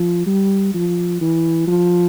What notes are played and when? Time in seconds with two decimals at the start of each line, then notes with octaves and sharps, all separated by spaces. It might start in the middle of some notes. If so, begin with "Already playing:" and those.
Already playing: F3
0.26 G3
0.74 F3
1.21 E3
1.68 F3